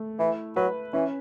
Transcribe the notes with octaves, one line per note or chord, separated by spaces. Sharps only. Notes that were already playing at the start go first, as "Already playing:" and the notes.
Already playing: A3
E3 E4
F#3 B4
E3 C#4